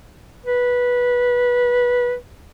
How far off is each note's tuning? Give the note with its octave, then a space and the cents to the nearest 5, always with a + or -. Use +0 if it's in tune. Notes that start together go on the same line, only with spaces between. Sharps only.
B4 -15